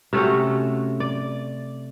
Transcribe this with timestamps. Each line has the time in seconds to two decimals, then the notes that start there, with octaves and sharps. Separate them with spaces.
0.13 C3 A3 C#4 F#4
1.00 D5